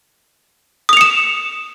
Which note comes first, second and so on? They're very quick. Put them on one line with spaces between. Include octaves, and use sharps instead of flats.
D#6 F7 C#7 E7